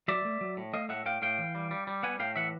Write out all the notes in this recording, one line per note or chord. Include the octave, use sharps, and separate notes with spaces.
F#3 D5 E5
A3
F#3
A2
A3 D#5 F5
A2 E5 F#5
A2 F5 G5
A2 F5 G5
E3
G3
G3
G3
B3 F#5 G#5
A2 F5 G5
E3 E5 F#5